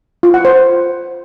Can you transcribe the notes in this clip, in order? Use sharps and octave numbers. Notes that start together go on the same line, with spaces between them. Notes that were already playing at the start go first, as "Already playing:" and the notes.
F4
F#5
C5